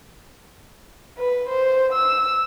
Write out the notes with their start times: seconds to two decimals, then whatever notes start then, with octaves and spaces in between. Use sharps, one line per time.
1.18 B4
1.49 C5
1.93 E6